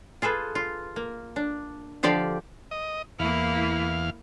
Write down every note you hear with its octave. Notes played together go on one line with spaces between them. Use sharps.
F4 G#4 A4 B4
F4
A#3
D4
D3 F3 G4 D5 F5 G5
D#5
E2 A#3 E4 F5